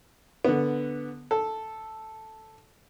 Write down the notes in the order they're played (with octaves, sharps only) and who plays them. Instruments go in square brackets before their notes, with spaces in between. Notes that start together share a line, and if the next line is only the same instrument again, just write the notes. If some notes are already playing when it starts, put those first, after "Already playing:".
[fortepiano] D3 B3
A4